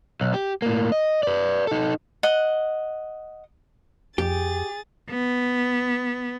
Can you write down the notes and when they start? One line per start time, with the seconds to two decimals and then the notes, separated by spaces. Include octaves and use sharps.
0.21 B1
0.34 G4
0.62 A2 A#3
0.92 D#5
1.23 B4 D5
1.67 D#4 A4
2.23 D#5 F#5
4.18 F2 G4 G#4 A6
5.10 B3